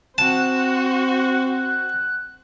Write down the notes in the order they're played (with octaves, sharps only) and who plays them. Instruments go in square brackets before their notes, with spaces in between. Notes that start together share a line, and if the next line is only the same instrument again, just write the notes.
[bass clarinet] C4 [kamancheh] F#4 C5 [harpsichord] A5 [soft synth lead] F#6